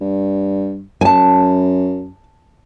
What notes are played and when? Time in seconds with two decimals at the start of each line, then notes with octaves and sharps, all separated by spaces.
0.01 G2
1.01 F#2 G#5 A5